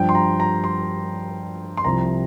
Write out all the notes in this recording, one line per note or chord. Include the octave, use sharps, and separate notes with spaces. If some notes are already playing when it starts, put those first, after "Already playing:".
Already playing: G2 F3 G5
C6
A#5
A#5
C6
C6
C2 C3 F3 A#5